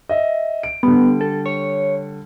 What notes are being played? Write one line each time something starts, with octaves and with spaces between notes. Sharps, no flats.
D#5 E5
D7
D3 G3 B3
A4
C#5